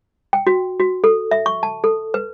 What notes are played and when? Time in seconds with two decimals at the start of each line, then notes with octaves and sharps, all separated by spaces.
0.33 G5
0.47 F#4
0.80 F#4
1.04 A4
1.31 E5
1.46 C#6
1.63 A5
1.84 A4
2.14 B4